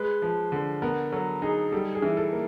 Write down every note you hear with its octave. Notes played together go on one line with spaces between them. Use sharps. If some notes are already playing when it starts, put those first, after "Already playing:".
Already playing: G#3 B4
F3
D3
B3 A#4
F#3 A4
D#4 G#4
G3 A4
G#4
E3
A4
A#3